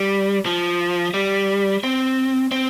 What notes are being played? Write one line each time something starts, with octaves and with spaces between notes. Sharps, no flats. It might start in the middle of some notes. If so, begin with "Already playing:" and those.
Already playing: G3
F3
G3
C4
C4